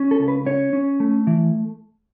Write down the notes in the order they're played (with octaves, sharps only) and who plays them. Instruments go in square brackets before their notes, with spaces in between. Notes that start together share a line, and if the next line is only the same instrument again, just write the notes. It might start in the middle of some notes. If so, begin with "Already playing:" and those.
Already playing: [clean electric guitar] C#4
A4
C#2
B4
C#4 C#5
C#4
A3
E3